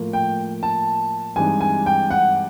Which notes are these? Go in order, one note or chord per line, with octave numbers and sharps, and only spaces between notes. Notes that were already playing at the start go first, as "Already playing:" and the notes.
Already playing: A2 F3 A#3
G5
A5
G2 E3 G#3 C4 D#4 G#5
G#5
G5
F#5